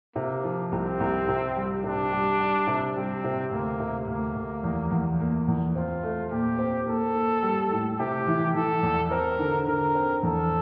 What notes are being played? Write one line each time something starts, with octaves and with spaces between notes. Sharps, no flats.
C3 A#3
F3
C2 C4
C2
C3
G3
C3 D4
G3
G3
C3
G3 C4
C3
D2 A#3
C3
D2 A#3
D2
E2
E2
A#3
E2
C4 F4
A3
A#2 G4
C4
A#3 A4
A#3
G3
A2
C3 G4
E3
E3 A4
E2
C4 A#4
D3
D3 A#4
C4
E2 A4